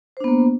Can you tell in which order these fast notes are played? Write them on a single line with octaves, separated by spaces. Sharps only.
C5 D4 B3 A#3